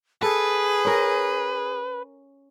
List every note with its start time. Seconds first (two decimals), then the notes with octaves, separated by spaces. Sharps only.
0.22 G#4 A4 B4
0.85 C#4 A#4